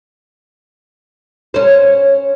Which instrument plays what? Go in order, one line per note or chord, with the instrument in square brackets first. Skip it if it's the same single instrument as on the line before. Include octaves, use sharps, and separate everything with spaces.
[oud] C#4 C5